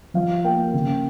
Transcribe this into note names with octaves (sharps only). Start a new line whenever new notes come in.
F3 F5
A#3 G5
C#3